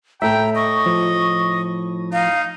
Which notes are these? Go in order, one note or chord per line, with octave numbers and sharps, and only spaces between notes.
A2 A4 E5 G5 A#5
D#5 C#6
F3
D#4 F5